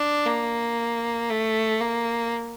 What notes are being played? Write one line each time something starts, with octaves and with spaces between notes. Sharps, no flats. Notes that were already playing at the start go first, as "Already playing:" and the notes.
Already playing: D4
A#3
A3
A#3